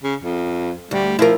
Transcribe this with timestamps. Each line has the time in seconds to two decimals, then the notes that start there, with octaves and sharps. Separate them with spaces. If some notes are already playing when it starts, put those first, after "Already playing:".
0.04 C#3
0.23 F2
0.91 D2 G3
1.19 F3 E4 A#4